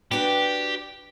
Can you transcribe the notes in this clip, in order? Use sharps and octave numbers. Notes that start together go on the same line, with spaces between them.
D4 F#4 G4 B4